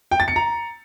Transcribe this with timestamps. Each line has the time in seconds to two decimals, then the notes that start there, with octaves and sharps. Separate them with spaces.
0.11 G5
0.20 A6
0.28 C#7
0.36 A#5